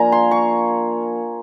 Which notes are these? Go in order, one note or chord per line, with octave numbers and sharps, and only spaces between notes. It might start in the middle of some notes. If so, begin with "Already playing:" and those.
Already playing: F3 A#3 D4 G#5 A#5
C6
C#6